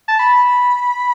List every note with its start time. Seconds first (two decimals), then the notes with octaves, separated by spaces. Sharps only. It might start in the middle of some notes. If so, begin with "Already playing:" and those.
0.08 A5
0.19 B5